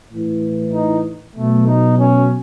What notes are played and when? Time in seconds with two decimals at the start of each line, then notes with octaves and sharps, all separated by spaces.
0.11 A2 E3
0.73 D#4
1.36 B2 F#3 A3
1.67 D#4
1.98 C#4